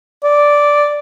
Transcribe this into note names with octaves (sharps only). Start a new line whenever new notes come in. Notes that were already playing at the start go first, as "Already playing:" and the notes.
D5